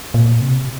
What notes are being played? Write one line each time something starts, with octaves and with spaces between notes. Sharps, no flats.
A#2
C3